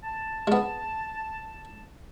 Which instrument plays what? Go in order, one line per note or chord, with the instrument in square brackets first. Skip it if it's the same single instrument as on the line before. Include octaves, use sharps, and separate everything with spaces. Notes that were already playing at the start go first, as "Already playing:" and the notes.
[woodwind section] A5
[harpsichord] G#3 B3